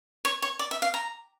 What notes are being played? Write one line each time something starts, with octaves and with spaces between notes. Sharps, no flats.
C#5
C#5
D5
E5
F5
A#5